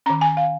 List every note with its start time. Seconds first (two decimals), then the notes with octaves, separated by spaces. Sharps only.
0.06 D#3 C#4 A#5
0.21 G#5
0.37 F5